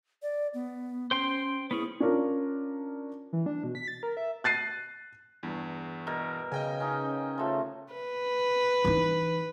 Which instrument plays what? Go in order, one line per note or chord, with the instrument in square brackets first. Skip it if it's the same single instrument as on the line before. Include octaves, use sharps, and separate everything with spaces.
[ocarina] D5
B3
[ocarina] C#4 [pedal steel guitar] C5 G5 C6
[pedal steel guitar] B3 C#4 G#4 [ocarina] E4
[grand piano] C#4 D4 F4 A#4
[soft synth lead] E3
D4
B2
B6
A6
A#4
E5
[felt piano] F#6 A6 C7 D#7
[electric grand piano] E2 G2
[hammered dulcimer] B2 A#4
[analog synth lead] C#3 [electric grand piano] D#5 G5 G#5
[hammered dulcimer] C#4 D#4
F3 A3 F#4
[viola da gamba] B4
[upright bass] E3 D#4